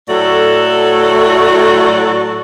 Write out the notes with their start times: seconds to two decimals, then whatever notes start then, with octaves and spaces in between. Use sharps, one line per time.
0.09 A2 F#3 A3 F#4 A4 D5